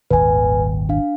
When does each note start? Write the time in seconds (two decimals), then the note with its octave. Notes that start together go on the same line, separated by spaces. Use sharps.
0.11 D#1 G#1 D#2 B4 G#5
0.89 D4 F5